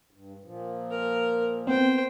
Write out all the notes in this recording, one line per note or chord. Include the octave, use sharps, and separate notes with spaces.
G2
A#2 F3
A#4
B3 C4 C5 G5